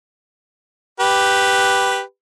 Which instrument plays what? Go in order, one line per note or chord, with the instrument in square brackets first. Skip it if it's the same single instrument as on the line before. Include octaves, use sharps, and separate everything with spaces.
[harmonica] G4 B4